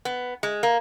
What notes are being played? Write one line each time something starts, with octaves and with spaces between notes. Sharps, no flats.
B3
G#3
A#3